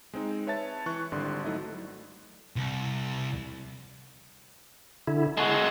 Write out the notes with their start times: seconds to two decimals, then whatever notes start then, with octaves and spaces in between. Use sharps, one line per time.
0.13 G#3 C4 D#4
0.47 B4 C#5 E5 A5 A6
0.86 E3 C#6 F#6
1.12 G#1 D3 G3 D5 C6
1.44 F#3 A3 D#4 E4
2.56 C2
5.07 D3 E4
5.37 G#3 F#4 A5 C6